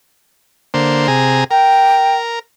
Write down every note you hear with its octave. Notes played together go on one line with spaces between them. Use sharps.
D3 A#3 C5
C3 G#4 A#5
A#4 G5